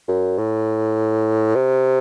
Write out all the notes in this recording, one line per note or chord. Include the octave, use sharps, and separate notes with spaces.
F#2
A2
C3